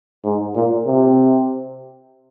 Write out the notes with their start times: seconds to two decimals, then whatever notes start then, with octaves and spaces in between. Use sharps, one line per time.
0.24 G#2
0.55 A#2
0.87 C3